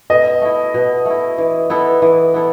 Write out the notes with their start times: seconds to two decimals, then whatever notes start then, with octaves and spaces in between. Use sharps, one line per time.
0.10 B2 D#5
0.41 A3 E4
0.74 B2
1.05 A3 E4
1.38 E3
1.70 B3 E4 A4
2.02 E3
2.34 B3 E4 A4